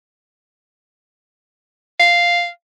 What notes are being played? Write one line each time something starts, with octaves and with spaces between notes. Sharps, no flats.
F5